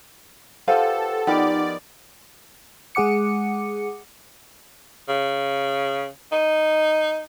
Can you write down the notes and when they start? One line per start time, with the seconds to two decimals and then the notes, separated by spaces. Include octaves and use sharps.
0.68 F4 G4 A4 B4 C5 F5 F#5
1.27 F3 B3 D#4 G4 A#4 D5 D#5 F6
2.95 G#3 G#4 F#5 D6 C#7
5.08 C#3
6.32 D#4